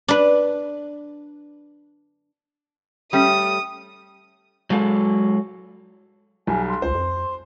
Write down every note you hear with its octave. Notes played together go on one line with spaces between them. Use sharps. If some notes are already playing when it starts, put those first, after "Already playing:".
D4 B4
G3 A3 C#4 D#6
F#3 G#3 F4 A4
B1 G3 G#5
C6
C#2 C5
F2